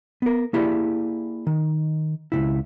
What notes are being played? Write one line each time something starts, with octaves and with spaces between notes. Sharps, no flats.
B3 A#4
A#3 E4 G4 G#4 D5
D#3
C#2 A#2 E4